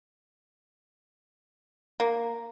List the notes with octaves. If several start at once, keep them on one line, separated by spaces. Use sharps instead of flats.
A#3